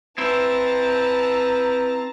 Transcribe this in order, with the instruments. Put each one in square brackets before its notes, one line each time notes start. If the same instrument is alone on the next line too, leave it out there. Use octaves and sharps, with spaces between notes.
[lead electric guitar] C4 E4 [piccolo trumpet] B4 [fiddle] A5 A#5